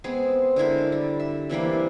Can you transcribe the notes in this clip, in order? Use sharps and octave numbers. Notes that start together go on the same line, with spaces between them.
G#3 B3 C4 G#4
D3 G#3 E4 A#4
G3
E5
C3 E3 G3 A#3